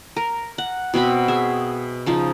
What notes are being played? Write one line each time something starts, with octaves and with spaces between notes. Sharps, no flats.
A#4
F#5
B2 C4 F#4 B5
G#4 E5
C#3 F3 D#4